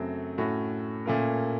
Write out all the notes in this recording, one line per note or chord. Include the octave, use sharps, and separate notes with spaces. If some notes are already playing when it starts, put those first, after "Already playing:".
Already playing: F#2 C#3 F#3 A3 C4
A2 A3 C#4 F#4
A#2 A3 C#4 F4 A#4